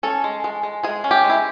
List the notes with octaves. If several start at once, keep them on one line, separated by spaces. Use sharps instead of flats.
C#4 A4
G#3
G#3
G#3
G#3 G#4
C#4
G4
G#3
E4